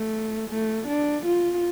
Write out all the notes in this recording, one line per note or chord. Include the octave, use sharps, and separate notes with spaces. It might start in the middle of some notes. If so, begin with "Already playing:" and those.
Already playing: A3
A3
D4
F4